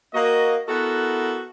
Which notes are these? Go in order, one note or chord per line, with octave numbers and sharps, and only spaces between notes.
A#3 F#4 D#5
B3 E4 F#4 A4 A#4 F#5